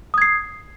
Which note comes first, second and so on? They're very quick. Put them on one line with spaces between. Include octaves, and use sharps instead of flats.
D#6 G#6 C7